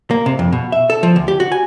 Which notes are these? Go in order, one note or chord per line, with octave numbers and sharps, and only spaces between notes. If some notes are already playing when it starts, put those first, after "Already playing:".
A#3
C3
F2
B2
E5
A4
F3
D2
G4
F#4
G#5